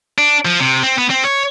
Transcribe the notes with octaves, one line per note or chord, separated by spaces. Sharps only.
D4
F3
C3
C4
B3
C4
C#5